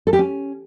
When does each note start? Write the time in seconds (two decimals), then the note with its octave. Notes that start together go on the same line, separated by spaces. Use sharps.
0.07 A4
0.13 G4
0.19 C#4